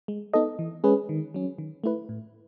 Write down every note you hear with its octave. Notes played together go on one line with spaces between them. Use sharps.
G#3
B3 D#4 A4 D#5
E3
G#3 C#4 G#4 B4
D#3
F#3 C#4
D#3
A3 E4 B4
A2